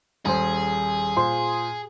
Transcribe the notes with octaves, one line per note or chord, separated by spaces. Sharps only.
D#1 G#4 C5
A#2 C5 C6